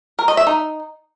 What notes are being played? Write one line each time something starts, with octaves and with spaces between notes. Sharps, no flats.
A#4
D#5
E5
D#4